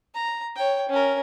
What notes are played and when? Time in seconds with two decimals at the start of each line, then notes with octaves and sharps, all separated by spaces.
0.15 A#5
0.56 C#5 G5
0.89 C#4 A#4